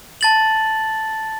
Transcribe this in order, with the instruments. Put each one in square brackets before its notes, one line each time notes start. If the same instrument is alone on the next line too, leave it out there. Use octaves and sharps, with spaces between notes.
[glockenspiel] A5 A6 F#7